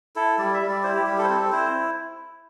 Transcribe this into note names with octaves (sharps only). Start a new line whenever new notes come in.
E4 A4
G3 D5
E5
G3
D5
E4 C5
G4
G3 G4
A4
C5
C4 A4
E4 C5